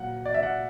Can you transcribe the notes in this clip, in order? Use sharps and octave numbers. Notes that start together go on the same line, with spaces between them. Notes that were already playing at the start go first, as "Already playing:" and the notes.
Already playing: A#2 F#3 F#5
D5
E5
F#5